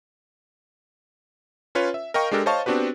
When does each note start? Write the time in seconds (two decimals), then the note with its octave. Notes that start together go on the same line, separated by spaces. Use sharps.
1.75 C#4 F4 B4 C#5
1.94 E5
2.14 A#4 D#5 F5 G5 C#6
2.31 G#3 D4 G4 A4 A#4
2.46 C5 C#5 D#5 F5 A5 C#6
2.66 B3 C4 D4 F#4 G4 B4